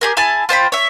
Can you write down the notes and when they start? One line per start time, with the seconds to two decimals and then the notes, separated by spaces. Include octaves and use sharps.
0.01 G4 G#4 A#4
0.17 E4 G#4 G#5 A5
0.49 F4 C5 G5 B5
0.72 C#5 E5